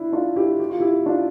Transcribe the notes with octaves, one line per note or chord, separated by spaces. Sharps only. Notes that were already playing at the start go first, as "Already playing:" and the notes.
Already playing: D4 E4
D4 F4
E4 G4
G4
F4
E4 G4
D4 F4